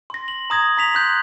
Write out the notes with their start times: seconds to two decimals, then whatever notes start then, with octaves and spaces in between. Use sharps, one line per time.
0.10 C6 A#6
0.28 F#7
0.50 A#5 D#6 G#6 A#6
0.78 A#5 B6 F7
0.95 C6 F#6 G6